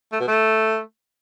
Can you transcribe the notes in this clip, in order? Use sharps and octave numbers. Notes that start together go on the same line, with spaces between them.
A3
B2
A3